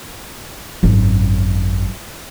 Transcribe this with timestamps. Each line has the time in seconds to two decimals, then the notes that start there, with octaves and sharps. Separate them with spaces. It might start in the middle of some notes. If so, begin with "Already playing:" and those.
0.83 G#1 F#2